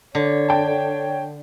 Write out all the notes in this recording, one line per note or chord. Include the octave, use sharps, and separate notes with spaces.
D3 C#5
G5 A5